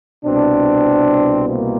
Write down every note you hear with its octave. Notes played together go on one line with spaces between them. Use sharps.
C2 B2 C4 D4
A#3 C4